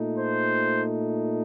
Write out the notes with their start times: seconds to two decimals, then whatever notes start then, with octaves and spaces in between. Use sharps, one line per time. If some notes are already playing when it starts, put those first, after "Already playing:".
Already playing: A#2 A3 D#4
0.17 C5